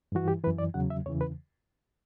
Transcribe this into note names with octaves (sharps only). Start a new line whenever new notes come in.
G2 E3 F#4
G4
F#2 E3 B4
D5
E2 C#3 F#3 F#5
E5
E2 C#3 E3 C#5
B4